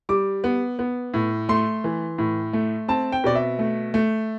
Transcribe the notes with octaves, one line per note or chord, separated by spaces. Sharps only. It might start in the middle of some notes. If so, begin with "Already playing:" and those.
G3 D6
B3
B3
A2
A3 C6
E3
A2
A3
C4 A5
G5
B2 D5
E5
A3
A3